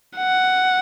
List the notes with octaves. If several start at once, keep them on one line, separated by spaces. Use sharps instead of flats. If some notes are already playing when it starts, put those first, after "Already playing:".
F#5